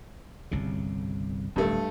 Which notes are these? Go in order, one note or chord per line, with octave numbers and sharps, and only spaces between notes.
G1 C2 C#3
D1 G2 A3